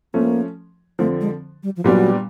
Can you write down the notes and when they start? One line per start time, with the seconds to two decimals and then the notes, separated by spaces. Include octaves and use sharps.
0.14 F3 A3 A#3 C#4
0.99 F2 D3 F3 A3
1.21 G#3
1.63 G3
1.77 F3
1.84 A#2 F#3 G3 B3 D4 G4